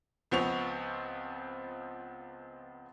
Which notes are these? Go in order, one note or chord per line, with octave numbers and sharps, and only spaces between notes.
C#2 F3 B3 C4 C#6 F7